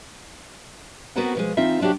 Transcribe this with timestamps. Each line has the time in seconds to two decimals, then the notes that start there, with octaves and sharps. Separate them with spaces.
1.16 B3 C4 F#4 A#4 B4 F#5
1.35 B2 F3 G#3
1.57 E3 C4 D#4 F4 E5
1.80 C3 F#3 D4 F#4 G4